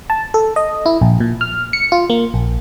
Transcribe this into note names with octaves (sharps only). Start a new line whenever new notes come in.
A5
A4
D#5
E4
A#1
A#2
F6
C#7
F4
A#3
A#1